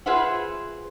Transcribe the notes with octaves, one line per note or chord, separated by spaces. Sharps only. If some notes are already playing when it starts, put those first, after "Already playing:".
F4 G#4 B4 C5 E5 F#5